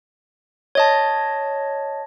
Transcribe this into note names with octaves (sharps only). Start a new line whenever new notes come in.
C#5 D#5 A5